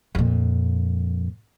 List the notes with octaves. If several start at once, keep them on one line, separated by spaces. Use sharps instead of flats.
F2 A#2